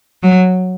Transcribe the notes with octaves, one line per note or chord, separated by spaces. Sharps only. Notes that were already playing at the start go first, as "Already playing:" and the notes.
F#3